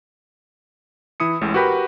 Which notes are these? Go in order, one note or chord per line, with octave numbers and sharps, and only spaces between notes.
E3 E4 D#6 C#7
A1 A2 G#3
F#4 G4 A#4 B4 G5 B5